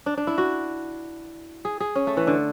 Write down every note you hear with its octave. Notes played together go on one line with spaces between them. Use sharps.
D4
D4
E4
F#4
G#4
G#4
C#4
A3
E3
D3